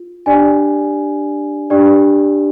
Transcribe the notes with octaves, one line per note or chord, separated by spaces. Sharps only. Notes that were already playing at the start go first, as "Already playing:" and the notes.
Already playing: F4
D4 G4 D5 G#5
D4 G4 D5